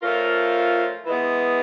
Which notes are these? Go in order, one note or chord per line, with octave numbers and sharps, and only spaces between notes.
F3 A3 C#4 F4 A#4
E3 G#3 B3